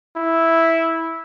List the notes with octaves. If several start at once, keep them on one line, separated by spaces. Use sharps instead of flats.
E4